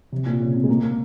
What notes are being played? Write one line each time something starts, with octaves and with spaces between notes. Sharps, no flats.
C3
A#2
C#3
C4
G#3
A#3
A#3